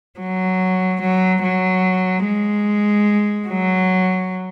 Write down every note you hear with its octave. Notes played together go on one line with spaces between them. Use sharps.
F#3
F#3
F#3
G#3
F#3